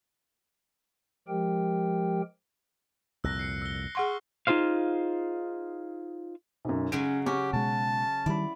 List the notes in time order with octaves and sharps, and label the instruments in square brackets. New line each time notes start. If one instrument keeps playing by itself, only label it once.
[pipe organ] F3 G#3 G4 A#4 G5
[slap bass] C2 F2 A#2 [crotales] E6 F#6 A#6
[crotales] C7 C#7
E6 G7
[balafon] G#4 F#5 C6 [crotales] C#6 F6
[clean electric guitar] D#4 F4 G#4 C5 F5
[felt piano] B1 F#2
[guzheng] C#3 F#3 G#3 [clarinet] C#4 [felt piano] D7
[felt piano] C#4 C#6 [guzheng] F#4 [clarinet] G4
[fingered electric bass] B2 G#3 [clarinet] A5
[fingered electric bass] D#3 G3 [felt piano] E4 B5 [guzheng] D5